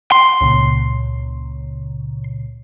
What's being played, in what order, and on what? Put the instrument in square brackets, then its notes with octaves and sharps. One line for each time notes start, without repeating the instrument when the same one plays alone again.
[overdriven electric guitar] C6
[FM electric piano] C#2 A#2 C#3